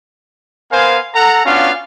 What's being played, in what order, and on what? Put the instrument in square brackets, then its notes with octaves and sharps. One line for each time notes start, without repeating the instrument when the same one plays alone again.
[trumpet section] B3 A#4 C5 F5 G#5
A4 F#5 A#5
B3 C#4 D4 F4 F#4 F5